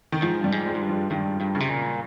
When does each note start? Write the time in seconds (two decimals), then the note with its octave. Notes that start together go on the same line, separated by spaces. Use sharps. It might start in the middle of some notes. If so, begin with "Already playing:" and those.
0.12 D#3
0.22 G#2 F3
0.40 G2 G3
0.52 G#2
0.66 G#3
0.75 G#2
0.81 G2
0.89 F3
1.10 G2 D#3
1.41 G2
1.55 C#3
1.60 C3
1.70 A#2